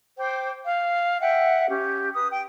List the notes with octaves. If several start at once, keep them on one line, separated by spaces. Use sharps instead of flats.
C5 G5 D6
F5
E5 F#5 G5
C#4 G4
B4 D#6
G5